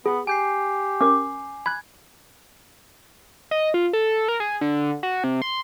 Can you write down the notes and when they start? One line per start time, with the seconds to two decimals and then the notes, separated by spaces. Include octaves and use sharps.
0.06 B3 G#4
0.27 G4 G#5 G6 C7
1.01 C#4 A#4 D6
1.66 B5 F#6 G#6
3.51 D#5
3.74 F4
3.93 A4
4.28 A#4
4.40 G#4
4.61 D3
5.03 F#4
5.24 C3
5.42 C6